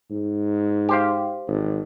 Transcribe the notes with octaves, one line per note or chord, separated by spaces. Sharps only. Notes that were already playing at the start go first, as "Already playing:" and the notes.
G#2
G4 C5 F5
G#1